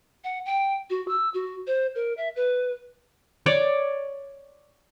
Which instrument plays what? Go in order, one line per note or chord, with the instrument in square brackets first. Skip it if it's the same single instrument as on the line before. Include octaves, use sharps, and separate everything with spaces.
[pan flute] F#5
G5
F#4
E6
F#4
C5
A#4
E5
B4
[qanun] C#5 D5